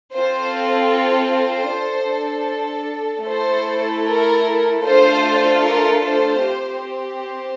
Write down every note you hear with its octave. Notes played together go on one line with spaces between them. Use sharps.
C4 F4 A4 C5
C5
D4 A4
A3 E4 A4 C5
A#4
A3 D4 F4 A4 C5
A#4
C5
C4 G4
C5